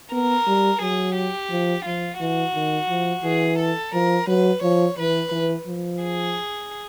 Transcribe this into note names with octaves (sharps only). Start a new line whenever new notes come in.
B3 A#4
G3
F#3 G#4
G4
F3
F3 F4
E3 F#4
D#3
F3
E3 G#4
A4
F3 A#4
F#3 B4
F3 C#5
E3 B4
E3
F3
G#4